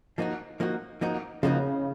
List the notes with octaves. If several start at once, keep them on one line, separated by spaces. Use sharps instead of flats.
F3 A#3 D#4 F#4
F3 A#3 D#4 F#4
F3 A#3 D#4 F#4
C#3 F3 A#3 D#4 F#4